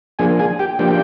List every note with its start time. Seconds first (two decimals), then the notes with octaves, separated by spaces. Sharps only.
0.19 F3 A#3 D4 G#4 G#5
0.39 G#4 G#5
0.59 G4 G5
0.79 F3 A#3 D4 G4 G5